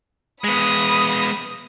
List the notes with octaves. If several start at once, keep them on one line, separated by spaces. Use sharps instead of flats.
G#3 B3 B5 D#6